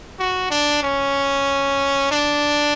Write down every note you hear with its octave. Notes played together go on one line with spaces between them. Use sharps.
F#4
D4
C#4
D4